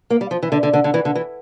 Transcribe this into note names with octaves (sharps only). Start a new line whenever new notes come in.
A#3
G3
F3
E3
D3
D3
D3
D3
E3
D3
E3